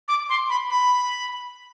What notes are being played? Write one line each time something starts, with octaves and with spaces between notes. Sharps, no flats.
D6
C6
B5
B5